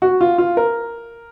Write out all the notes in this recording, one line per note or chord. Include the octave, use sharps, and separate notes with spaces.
F#4
F4
F4
A#4